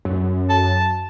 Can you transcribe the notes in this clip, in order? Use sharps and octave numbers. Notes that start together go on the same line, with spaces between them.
F#2
A5